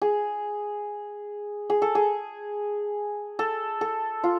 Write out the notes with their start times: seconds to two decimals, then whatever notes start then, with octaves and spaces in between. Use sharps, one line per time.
0.02 G#4
1.70 G#4
1.82 A4
1.95 G#4
3.39 A4
3.81 A4
4.24 F4